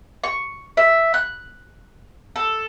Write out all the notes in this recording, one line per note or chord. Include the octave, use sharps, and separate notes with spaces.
C#6
E5
F#6
A4